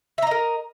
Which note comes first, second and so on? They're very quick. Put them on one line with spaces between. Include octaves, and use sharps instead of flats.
E5 A#5 D#5 A#4